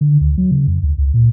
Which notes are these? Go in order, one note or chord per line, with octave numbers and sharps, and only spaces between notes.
D3
D2
F#3
C#3
F2
D2
C#2
A#2